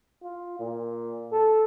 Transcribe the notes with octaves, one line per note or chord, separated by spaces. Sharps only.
F4
A#2
A4